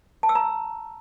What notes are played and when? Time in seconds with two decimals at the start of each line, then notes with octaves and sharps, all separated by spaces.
0.23 A5
0.29 E6
0.35 A#5